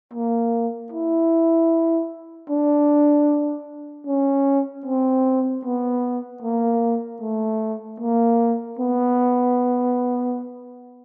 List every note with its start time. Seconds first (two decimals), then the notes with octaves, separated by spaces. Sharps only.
0.13 A#3
0.92 E4
2.50 D4
4.07 C#4
4.86 C4
5.65 B3
6.42 A#3
7.22 A3
8.00 A#3
8.79 B3